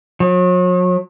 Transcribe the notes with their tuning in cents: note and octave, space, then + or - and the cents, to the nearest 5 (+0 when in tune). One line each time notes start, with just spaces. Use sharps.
F#3 -40